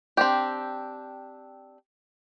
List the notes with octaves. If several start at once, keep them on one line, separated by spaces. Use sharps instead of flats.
C4 D4 G4